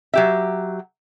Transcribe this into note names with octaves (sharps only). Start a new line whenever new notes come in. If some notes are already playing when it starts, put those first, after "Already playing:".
F#3 G4 E5